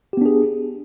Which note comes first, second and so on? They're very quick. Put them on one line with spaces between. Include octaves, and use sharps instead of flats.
G4 B3 D4 G#4